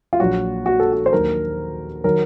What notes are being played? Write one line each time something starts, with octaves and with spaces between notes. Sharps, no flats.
F4
A#1 A#2 F#3 F#4
F#4
A4
F#4
C5
D#2 D#3 F#3 A#4
D#3 F#3 A#4